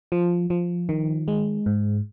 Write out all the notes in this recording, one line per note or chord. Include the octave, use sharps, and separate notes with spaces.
F3
F3
D#3
G#3
G#2